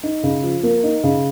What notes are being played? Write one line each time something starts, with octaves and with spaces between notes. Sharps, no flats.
D#4
C#3
F3
A#3
D#4
C#3